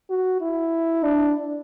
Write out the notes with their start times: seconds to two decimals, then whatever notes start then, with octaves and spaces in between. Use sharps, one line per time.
0.10 F#4
0.41 E4
1.04 D4